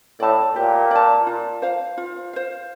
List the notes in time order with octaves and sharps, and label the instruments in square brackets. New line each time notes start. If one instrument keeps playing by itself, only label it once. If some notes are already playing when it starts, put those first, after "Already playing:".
[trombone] A2 [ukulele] D5 A5
[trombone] A#2 [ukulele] G4
[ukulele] D5 A5
F4
C5 F5
F4
C5 F5